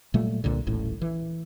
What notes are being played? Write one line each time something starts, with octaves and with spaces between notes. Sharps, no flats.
A#2 F#3 G3 A3
C2 A#2 D3
D#1 A1 A2
E3